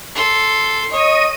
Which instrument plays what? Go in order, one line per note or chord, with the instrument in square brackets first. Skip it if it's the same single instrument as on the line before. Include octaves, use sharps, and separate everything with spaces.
[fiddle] A4 C6
[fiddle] C#5 [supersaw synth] D#5 D#7